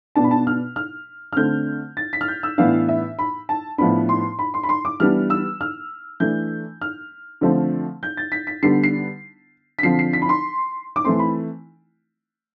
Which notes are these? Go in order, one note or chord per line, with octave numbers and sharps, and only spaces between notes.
B2 B3 D4 A5
B5
A5
F6
F6
F6
D3 A3 C4 G6
A6
B6
F6
G6
E6
A2 E3 B3 D4 F5
E5
B5
A5
A2 F3 B3 D4 B5
C6
B5
C6
B5
C6
D6
E3 G3 B3 D4 F6
E6
F6
E3 A3 D4 G6
F6
D3 F3 A3 C4
G6
A6
B6
B6
D3 G3 B3 D4 C7
C7
B6
D3 F3 C4 C7
C7
B6
B5
C6
D6
E3 A3 C4 C6
B5